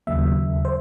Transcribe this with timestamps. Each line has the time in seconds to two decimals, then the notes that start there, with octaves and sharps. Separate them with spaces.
0.07 D#2 C#3 F#3 A#3 E5
0.65 C5